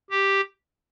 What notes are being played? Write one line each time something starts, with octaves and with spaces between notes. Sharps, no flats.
G4